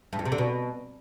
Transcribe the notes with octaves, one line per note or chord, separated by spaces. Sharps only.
G2
F2
C3
D3
B2